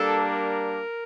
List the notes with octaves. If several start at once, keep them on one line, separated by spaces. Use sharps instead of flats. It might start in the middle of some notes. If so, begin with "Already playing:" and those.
Already playing: G3 A#3 D4 A4
A#4